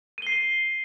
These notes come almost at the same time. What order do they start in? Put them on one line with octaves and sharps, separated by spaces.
D#7 G7 C7